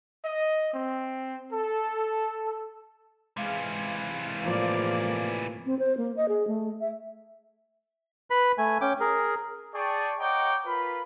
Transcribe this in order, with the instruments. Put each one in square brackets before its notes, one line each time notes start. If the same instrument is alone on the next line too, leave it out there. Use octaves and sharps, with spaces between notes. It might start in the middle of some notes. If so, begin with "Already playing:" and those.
[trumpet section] D#5
C4
A4
[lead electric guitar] C3 E3 [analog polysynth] G#3 F5
[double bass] A2 F3 [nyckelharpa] A#3 D5
[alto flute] C4
C5
A#3
D#5
G#4
A3
E5
[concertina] B4 B5
A3 G#5
C#4 G5 D6
G#4 A#4
[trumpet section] G#4 D5 G5 A5 C#6
C#5 D#5 F#5 G5 A#5 D6
F4 A#4 B4 B5